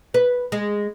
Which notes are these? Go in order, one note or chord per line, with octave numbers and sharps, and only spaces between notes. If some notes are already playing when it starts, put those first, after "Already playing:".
B4
G#3